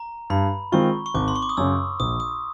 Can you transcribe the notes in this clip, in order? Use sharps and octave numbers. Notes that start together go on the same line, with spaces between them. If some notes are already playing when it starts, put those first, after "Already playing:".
Already playing: A#5
G2 B5
D#3 G#3 C4 F4 C#6
C#6
G#1 D6
C6
C#6
D6
D#6
F#2 C#3 E6
A#1 D#6
D#6